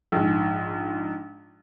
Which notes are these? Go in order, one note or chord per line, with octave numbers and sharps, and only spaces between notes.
A#1 G#2